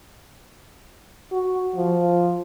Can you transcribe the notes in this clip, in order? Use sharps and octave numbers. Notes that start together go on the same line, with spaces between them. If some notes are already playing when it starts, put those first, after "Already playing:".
F#4
F3